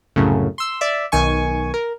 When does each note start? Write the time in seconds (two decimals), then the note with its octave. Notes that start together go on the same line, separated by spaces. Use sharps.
0.16 C2 F#2 A2 C#3
0.58 C6 E6
0.81 D5 E5
1.12 B1 D#3 G#5 C#6
1.74 A#4